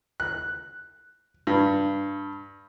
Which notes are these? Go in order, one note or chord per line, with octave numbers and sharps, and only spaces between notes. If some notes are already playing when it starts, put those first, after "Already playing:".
F#6
G2